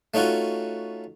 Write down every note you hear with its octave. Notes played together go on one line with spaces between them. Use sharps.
A3 C#4 D#4 F4 F#4